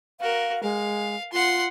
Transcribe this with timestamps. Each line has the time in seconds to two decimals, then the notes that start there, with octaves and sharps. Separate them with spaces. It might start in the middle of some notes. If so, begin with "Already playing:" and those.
0.20 F#4 A#4 F5
0.63 G#3 F5
1.32 F4 F#5 C6